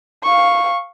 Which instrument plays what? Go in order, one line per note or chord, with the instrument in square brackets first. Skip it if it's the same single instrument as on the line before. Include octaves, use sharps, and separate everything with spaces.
[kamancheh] F5 C#6